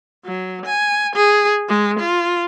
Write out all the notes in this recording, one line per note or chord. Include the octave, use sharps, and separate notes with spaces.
F#3
G#5
G#4
G#3
F4